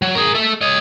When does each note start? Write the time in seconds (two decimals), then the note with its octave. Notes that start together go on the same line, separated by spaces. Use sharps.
0.02 F#3
0.15 G#4 A#4
0.35 A4 E5
0.61 C#5 D#5